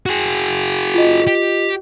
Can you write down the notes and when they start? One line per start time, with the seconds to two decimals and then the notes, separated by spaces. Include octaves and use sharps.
0.06 F#4 G#4
0.94 F4 D#5
1.27 G4